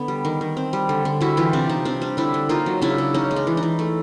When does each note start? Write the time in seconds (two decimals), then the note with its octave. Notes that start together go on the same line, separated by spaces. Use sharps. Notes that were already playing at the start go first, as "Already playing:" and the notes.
Already playing: D3 B3
0.08 G3
0.25 D#3
0.41 D#3
0.57 C4
0.73 G3
0.89 D3
1.05 D3
1.21 G3 E4 F#4
1.37 E3 F4 G4
1.53 C3 D4
1.69 C3 D#4
1.85 C4 D4
2.01 G3 D4
2.17 D3 D4 E4
2.34 D3
2.49 A#3 D#4 F4
2.66 F#3
2.82 C#3 D4 E4
2.98 C#3
3.14 C#4 D#4
3.31 G#3
3.36 D4
3.47 E3
3.57 D#4
3.63 E3
3.79 A3